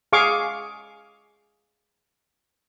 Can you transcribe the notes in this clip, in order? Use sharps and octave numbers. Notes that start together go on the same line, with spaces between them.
G#4 F5 C#6 D6